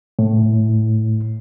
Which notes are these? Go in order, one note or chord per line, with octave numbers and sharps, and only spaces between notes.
A2